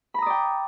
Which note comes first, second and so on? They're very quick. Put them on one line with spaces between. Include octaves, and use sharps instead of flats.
B5 A#5 D#6 D5 G5